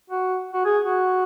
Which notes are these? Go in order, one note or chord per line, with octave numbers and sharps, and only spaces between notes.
F#4
F#4
G#4
F#4